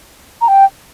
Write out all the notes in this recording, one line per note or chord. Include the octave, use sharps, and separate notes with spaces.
A#5
G5